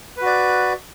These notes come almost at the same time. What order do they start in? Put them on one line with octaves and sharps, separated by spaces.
B4 F#4 D5